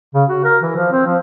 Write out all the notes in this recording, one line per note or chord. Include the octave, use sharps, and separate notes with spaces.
C#3
F#4
A#4
E3
F3
C4
F3